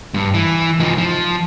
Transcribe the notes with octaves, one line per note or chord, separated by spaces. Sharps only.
G2
E3
F3 D#4
F3